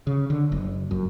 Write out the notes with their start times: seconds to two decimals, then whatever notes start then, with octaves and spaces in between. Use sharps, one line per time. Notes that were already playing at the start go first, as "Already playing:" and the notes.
0.07 C#3
0.30 D3
0.52 F#1
0.91 F#2